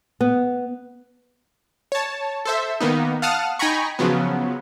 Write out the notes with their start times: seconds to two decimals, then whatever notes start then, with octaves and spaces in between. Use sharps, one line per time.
0.21 B3
1.92 C#5 A5
2.45 A4 C5 E5
2.81 D#3 A#3 B3 D#4
3.22 F5 F#5 A5 D#6 F6
3.59 D#4 G5 G#5 A#5 B5 C#6
3.99 C#3 F3 F#3 B3